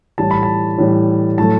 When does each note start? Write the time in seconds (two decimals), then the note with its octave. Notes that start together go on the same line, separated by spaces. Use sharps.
0.18 A2 E3 G3 A5
0.31 B5
0.43 A5
0.78 A2 E3 G3
1.38 A2 F#3 A3 A5